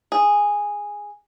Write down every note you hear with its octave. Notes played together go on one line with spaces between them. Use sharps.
G#4